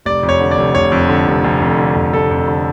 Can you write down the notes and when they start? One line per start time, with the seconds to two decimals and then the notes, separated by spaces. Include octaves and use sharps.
0.05 F1 D5
0.23 F2
0.29 C#5
0.40 D3
0.51 D5
0.58 F1
0.75 F1 C#5
0.92 F2
1.09 D3
1.27 F1
1.44 F1
1.61 F2
1.78 D3
1.96 F1
2.13 F1 A4
2.31 F2
2.48 D3